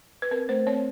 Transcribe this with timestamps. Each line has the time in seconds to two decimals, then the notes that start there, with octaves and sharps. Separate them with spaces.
0.22 B4
0.31 C4 A#4
0.49 A3 C5
0.67 C4 C#5